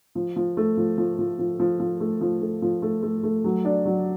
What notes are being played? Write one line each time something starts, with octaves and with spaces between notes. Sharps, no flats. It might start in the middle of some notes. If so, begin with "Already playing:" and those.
F3
F3
A3
F3
F3
F3
F3
F3
F3
A3
F3
A3
F3
A3
A3
A3
F#3
D4
F#3